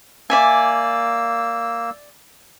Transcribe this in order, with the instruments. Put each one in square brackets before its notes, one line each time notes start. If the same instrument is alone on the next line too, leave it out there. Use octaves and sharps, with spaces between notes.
[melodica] A#3 E6 [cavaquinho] D5 E5 G#5